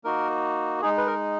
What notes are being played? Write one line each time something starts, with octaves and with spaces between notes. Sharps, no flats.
A#3 D#4 F#4 A#4
G#3 D#4 G#4
B4
A#4